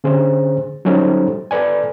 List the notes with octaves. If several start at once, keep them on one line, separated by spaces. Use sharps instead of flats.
D3 C#4 G#4 C5
F#3 G3 C#4 D#4 A4 C5
A4 B4 D5 G#5